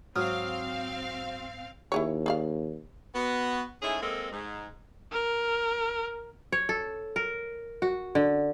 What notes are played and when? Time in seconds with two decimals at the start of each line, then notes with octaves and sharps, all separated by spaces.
0.16 G#2 F#3 C4 F5 D#6 F6
1.92 D#2 E4 G#4 C#5
2.26 G#4 D5 F5
3.15 B3 F#4
3.82 G#2 G#3 A3 C#4 E4 G#4
4.02 G#3 A#3 C4 A4 D#5
4.32 G#2
5.12 A#4
6.52 C#5
6.69 A4
7.16 A#4
7.82 F#4
8.15 D3